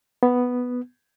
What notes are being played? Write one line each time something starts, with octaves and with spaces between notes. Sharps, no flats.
B3